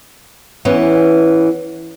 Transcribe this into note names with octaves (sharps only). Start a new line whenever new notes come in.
E3 B3 C#4